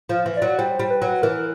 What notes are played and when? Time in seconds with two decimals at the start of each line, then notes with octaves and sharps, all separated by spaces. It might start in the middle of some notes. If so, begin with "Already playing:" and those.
0.09 F3
0.26 E3
0.36 D5
0.42 F#3
0.58 G3 C5
0.80 G3
0.90 B4
1.02 F#3
1.23 E3 A#4